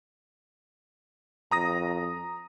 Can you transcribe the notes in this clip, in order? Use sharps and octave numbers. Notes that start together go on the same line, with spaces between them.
F2 A#5 D#6 A#6